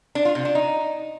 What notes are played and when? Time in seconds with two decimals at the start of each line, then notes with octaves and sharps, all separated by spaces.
0.15 D4
0.25 F4
0.35 C3
0.45 D4
0.55 D#4